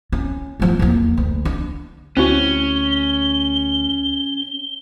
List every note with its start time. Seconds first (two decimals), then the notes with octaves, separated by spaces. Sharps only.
0.12 C#4
0.60 F3 A3
0.79 E2 A#3
1.17 D2
1.45 D4
2.17 D2 C4 C#4 E4 F#4 G7